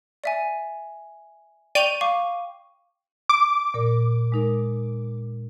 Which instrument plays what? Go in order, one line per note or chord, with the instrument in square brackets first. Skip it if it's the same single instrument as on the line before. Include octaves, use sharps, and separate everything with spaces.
[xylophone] D5 E5 G#5
[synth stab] D5 G6 D#7 [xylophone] G5 C#6 F7
[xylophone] F5 C#6 D6
[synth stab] D6
[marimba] A#2 A#4 D5
G#3 D#4 A#4